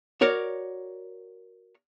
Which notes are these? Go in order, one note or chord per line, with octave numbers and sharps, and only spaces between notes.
F#4 A#4 C#5 D5